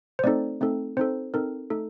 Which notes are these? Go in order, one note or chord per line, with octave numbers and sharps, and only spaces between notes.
C5
A3 C4 D#4 A4 D5
A3 C4 D#4 A4
C4 D#4 A4 C5
C4 D#4 A4 A#4
A3 D#4 A4